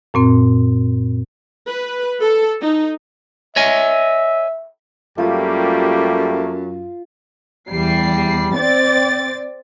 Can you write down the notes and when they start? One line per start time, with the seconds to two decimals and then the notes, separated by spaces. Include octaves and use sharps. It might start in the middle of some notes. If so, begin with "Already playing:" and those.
0.14 F#2 A#2 C4
1.67 B4
2.21 A4
2.60 D#4
3.56 C#5 D#5 E5 G#5
5.18 F#2 G3 A3 A#3 F4 G4 D#6
7.70 E2 G3 C7
8.54 C4 D5 A6